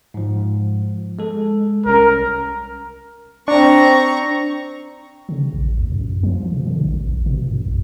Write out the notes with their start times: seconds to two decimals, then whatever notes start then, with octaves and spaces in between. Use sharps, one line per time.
0.14 G#2 F3
1.19 G#3 A4
1.86 C2 C#4 A#4
3.48 C4 D4 A#5 C#6
5.29 C#3
5.54 A1
5.78 D2
5.92 F#2
6.23 F3
6.52 B2
6.67 D3
6.85 G#1
7.08 A1
7.26 B2
7.49 F#2
7.66 G#1